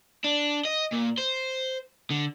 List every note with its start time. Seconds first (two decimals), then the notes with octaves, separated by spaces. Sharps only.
0.24 D4
0.65 D#5
0.93 A#2
1.18 C5
2.10 D3